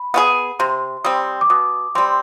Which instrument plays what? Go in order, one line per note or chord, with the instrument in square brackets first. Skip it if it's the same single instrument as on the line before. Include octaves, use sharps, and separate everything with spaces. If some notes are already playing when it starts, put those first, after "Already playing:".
Already playing: [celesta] B5
[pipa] B3 F4 G#4
[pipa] C3 [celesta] C6
[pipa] G3 C4 [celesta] D#6
[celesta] D6
[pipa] B2 [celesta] D#6
[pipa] G3 C4 [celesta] C6